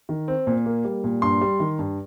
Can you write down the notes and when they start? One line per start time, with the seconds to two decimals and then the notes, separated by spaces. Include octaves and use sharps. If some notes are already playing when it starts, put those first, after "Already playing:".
0.09 D#3
0.28 C4
0.47 A#2
0.66 A#3
0.84 G3
1.04 A#2
1.22 G2 C6
1.41 G3
1.60 D#3
1.79 G2